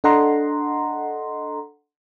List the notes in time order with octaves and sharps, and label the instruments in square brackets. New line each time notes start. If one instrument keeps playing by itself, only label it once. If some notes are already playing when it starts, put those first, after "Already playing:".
[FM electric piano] D4 A4 D#5 F#5 A#5 C6